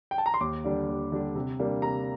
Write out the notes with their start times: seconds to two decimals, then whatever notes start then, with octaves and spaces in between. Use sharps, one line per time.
0.11 G5
0.18 A5
0.26 A#5
0.34 C6
0.41 D#2 D6
0.64 D3 G3 D4
0.89 D#2
1.12 D3 G3 D4
1.35 C3
1.60 G3 A#3 D4
1.82 C3 A#5